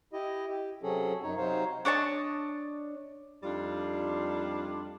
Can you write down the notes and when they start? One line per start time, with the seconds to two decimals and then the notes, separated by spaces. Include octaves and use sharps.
0.13 E4 G4 D#5
0.49 G4
0.83 C3 F#3 C#4 G#4 A4
1.23 F#2 D#4 C#5
1.37 C3 F#3 D#4 C5 C#5 F5
1.85 D4 C#5 D#5 A5
3.43 F2 G3 D4 D#4 F4